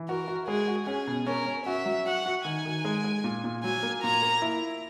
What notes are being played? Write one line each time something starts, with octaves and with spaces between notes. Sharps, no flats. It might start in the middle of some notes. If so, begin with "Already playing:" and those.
Already playing: E3
F#4 A#4
F#4
G#3 G#4
F#4
C#4 G#4
B2
C#4 A#4
C#4
F#4 E5
F#3
F#4 F#5
F#4
D#3 G#5
D#3
G#3
G#3
A#2
A#2
F#3 G#5
A#3
A#2 A#5
A#3
E4